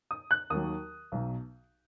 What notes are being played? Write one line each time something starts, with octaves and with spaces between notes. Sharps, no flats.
D#6
F#6
D#2 D#3 F#3 D#6
B1 B2 F#3